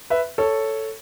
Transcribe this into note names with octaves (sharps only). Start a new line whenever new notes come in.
B4 E5
A4 C#5